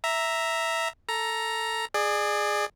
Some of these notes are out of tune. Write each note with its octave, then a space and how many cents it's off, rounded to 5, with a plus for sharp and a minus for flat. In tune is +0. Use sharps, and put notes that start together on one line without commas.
E5 +0 A#5 +0
A4 +10 A#5 +10
G#4 +0 D5 +30